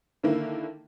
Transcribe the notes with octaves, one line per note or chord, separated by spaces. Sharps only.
D3 D#3 A#3 E4